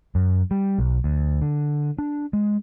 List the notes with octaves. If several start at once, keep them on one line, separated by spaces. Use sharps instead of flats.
F#2
G3
B1
D2
D3
D4
G#3